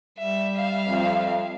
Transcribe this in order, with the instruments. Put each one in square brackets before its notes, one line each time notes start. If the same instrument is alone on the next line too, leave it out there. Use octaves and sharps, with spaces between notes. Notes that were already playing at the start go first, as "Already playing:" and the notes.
[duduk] G3 [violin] E5
[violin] E5 F5
[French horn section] F2